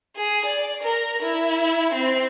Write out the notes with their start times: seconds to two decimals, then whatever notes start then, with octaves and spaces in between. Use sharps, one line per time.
0.16 G#4
0.45 D5
0.83 A#4
1.22 E4
1.93 C4